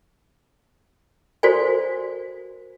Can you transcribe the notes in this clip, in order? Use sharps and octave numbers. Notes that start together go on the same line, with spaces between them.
F#4 A4 A#4 C5 D5 G#5